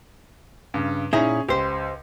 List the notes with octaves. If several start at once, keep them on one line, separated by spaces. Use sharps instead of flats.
G2 C#3
A#2 C#4 D#4 E4 G#4
C#2 G4 C5